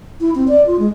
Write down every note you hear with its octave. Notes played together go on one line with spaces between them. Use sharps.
E4
C4
D5
F4
G#3